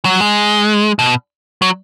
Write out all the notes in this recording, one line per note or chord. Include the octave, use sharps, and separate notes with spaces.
F#3
G#3
B2
F#3